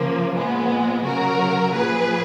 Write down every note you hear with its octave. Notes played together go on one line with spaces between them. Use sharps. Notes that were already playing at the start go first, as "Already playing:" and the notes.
Already playing: C#3 F3 A#3
A#2 F3 G#3 B3
C#3 F#3 F#4 A#4
A#2 F3 G#4 B4